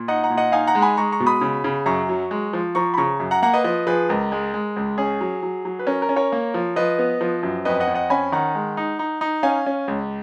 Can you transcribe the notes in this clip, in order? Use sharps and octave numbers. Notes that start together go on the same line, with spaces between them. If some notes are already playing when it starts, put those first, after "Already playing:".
Already playing: A#2
D#4 D#5 F#5
F#5 A#5
A#2
D#5 F#5
D#4 F5 G#5
F#5 A#5
G#3
G#5 B5
G#3 A#5 C#6
A#5 C#6
B2
B5 D#6
C#3
C#3
F#2 A#5 C#6
F#3
G#3
F3
F3 A#5 C#6
B5
C#3 A#5 C#6
F#2
F#5 A#5
A#3 F#5 A#5
B4 D#5
F3 B4 D#5
F3 G#4 B4
C#2 A#4
G#3
G#3
C#2
C#4 G#4
F#3
F#3
F#3
B4
C#4 A#4
A#4
C#4
A#4 C#5
A#3
F3
F3 B4 D#5
B3
F3
F#2
F2 B4 D#5
D#5 F#5
F2
D#5 F#5
C#4 G#5 B5
D#3 F#5 A#5
G#3
D#4
D#4
D#4
C#4 F5 G#5
C#4
C#2